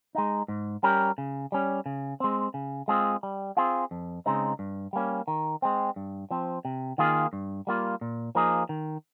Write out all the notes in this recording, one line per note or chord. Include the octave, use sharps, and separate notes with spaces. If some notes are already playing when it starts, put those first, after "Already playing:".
G#3 D#4
G#2
G3 C#4 G4 A#4
C#3
G3 C#4
C#3
G#3 C4
C#3
G#3 C4 F4 G#4
G3
C4 F4 G#4
F2
C#3 G#3 C4 D#4
G2
G3 A#3 C#4
D#3
G#3 C4
G2
F3 C4
C3
D#3 A#3 F4 G#4
G2
G3 A#3 F4
A#2
F3 A#3 D#4 G#4
D#3